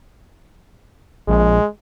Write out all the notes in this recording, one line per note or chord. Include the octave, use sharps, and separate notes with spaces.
A#1 G#3